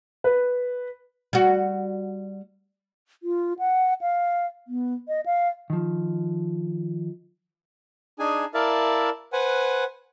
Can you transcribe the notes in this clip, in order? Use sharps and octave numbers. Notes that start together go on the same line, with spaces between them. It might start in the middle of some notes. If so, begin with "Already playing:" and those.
B4
G3 F#4
F4
F#5
F5
B3
D#5
F5
D#3 F3
D4 D#4 G#4 G#5
E4 A#4 D5 E5 F5 A5
B4 C5 F#5 G#5